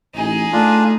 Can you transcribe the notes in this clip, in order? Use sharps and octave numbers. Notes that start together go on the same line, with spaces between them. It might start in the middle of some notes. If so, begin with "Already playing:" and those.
A1 D#4 G#4
A3 D4 F4